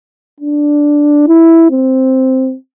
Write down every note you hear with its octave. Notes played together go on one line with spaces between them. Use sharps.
D4
E4
C4